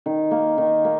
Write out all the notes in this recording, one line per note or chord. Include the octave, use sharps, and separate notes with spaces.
D#3
A#3
D#3
A#3